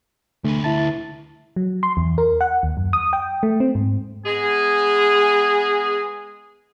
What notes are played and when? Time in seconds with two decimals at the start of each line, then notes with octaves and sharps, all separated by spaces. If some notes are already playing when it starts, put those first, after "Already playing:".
0.44 D2 A3 D4 B4
0.64 E4 E5 A5 A6
1.56 F#3
1.83 C6
1.97 E2
2.18 A#4
2.41 F#5
2.63 D#2
2.77 F#2
2.93 D#6
3.13 G5
3.43 A3
3.60 C4
3.75 G#2
4.26 G#3 B3 G#4